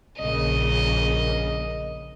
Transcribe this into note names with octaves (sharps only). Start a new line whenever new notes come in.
A#1 C#3 A#3 D#5